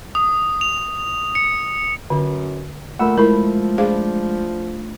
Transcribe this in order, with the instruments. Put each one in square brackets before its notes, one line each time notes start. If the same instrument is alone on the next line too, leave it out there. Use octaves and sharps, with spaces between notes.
[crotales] D#6
F7
C#7
[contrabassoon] F#2 [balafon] D3
[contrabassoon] A#2 [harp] A3 B5 E6 [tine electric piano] A#4 F#5
[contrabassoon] F3 [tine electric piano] G#3 [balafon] E4 A#4 [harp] B5
[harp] D4 F4 [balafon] G#4 C5 F5